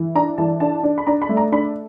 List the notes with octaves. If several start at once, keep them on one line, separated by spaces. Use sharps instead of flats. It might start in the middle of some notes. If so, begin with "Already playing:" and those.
Already playing: E3
D4 A#5
E3 A5
D4 A5
D4
B5
D4 A#5
B5
A3
A#5
D4 B5